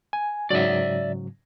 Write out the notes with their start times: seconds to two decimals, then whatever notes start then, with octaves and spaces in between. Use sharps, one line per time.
0.13 G#5
0.50 G#2 C#3 F#3 D5 E5